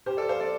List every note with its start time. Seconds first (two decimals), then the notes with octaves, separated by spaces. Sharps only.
0.06 G4 C5
0.17 A4 D5
0.29 C5 F5
0.40 A4 D5